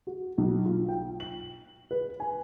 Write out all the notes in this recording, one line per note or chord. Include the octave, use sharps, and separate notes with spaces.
F#4
B1
F4
G5
F#7
B4
G#5